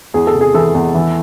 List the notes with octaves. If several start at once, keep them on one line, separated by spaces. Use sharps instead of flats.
E2 G#4
A4
C3
G#4
E3 A4
E2
E3